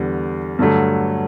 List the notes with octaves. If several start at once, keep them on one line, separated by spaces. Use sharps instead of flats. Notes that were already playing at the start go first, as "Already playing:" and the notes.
Already playing: E2 D3 G3
G2 D3 F#3 A3